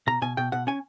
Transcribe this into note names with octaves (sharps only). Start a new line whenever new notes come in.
B2 A#5
B2 G#5
B2 G5
B2 F#5
C#4 G#5